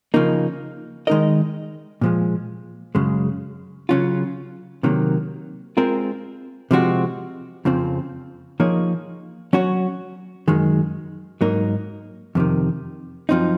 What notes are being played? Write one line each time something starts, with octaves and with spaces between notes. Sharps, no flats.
C#3 F3 A#3 D#4
D#3 G#3 D#4 A#4 D#5
A#2 F3 G#3
F#2 C#3 G#3
C#3 F#3 C#4 F4
C3 D#3 F#3 A#3
G#3 C4 F4 A#4
C3 F3 G#3 C4 F#4
F2 C#3 F3 C4
F3 A#3 D#4 G#4 C#5
F#3 C#4 F#4 C#5
F#2 D#3 G#3
G#2 F#3 A#3 D#4 A#4
F2 C3 D#3
F#2 F3 C4 D#4